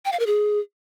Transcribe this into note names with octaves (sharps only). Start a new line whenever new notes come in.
G5
F5
A#4
G#4